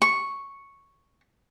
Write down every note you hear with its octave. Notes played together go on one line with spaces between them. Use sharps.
C#6